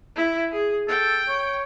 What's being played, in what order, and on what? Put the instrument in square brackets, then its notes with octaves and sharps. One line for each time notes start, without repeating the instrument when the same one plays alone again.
[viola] E4
G#4
[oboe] A4 [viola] G5
[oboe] C#5